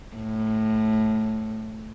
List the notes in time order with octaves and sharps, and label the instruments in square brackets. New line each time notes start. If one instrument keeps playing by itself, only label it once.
[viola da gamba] A2